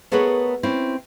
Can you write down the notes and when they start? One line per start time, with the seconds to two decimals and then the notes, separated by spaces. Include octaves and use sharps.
0.12 A3 B3 G#4 A#4 B4 C#5
0.63 C4 C#4 E4